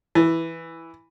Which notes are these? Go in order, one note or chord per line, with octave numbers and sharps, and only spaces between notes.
E3